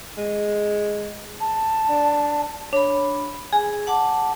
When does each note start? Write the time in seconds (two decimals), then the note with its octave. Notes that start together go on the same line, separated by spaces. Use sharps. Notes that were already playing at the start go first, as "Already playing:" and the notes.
0.18 G#3
1.40 A5
1.89 D4
2.73 D4 C#5 B5
3.53 G#4 G#5
3.87 F#5 A5 D6